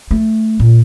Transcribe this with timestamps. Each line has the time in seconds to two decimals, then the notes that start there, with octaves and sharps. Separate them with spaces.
0.11 A3
0.60 A#2